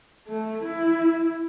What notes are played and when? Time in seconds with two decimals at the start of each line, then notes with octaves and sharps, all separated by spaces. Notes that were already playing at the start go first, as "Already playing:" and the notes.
0.27 A3
0.63 E4